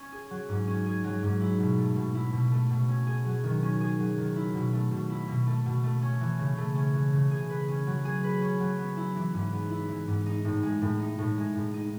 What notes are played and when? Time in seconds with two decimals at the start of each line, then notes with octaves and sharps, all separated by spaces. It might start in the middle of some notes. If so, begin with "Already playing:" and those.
Already playing: C#4
0.12 G#4
0.31 F#3
0.49 G#2
0.67 C#4
0.86 G#4
1.04 F#3
1.23 G#2
1.41 E4
1.60 B2
1.78 A3
1.96 B2
2.15 E4
2.33 B2
2.52 A3
2.70 B2
2.89 C#4
3.07 G#4
3.26 F#3
3.44 D#3
3.62 C#4
3.81 G#4
3.99 F#3
4.18 D#3
4.36 E4
4.54 B2
4.73 A3
4.91 B2
5.10 E4
5.28 B2
5.47 A3
5.66 B2
5.84 A3
6.02 C#4
6.20 E3
6.39 C#3
6.58 A3
6.75 C#4
6.94 E3
7.13 C#3
7.31 G#4
7.50 B4
7.68 C#4
7.87 F#3
8.05 G#4
8.24 B4
8.42 C#4
8.60 F#3
8.78 B3
8.97 E4
9.16 E3
9.34 G#2
9.53 B3
9.71 E4
9.89 E3
10.08 G#2
10.26 D#4
10.45 A2
10.63 G#3
10.82 A2
11.00 D#4
11.18 A2
11.37 G#3
11.55 A2
11.74 D#4